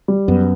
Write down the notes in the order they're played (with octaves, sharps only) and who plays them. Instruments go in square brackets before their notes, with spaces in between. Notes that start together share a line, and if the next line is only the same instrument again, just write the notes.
[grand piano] G3
[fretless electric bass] F#2 [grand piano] B3